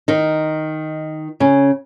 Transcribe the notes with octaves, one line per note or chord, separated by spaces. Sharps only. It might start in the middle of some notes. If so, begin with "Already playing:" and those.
D#3 D#4
C#3 C#4